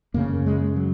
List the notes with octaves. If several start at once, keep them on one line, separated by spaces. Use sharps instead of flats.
F#2 C#3 A#3
G#3
F#3